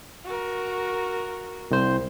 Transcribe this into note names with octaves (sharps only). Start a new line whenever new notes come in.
F#4 A#4
C2 C5